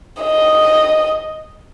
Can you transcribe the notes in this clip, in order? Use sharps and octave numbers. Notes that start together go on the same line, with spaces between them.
D#5